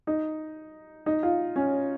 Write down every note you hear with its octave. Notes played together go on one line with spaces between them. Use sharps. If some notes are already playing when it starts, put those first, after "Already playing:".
D#4
D#4
F4
C#4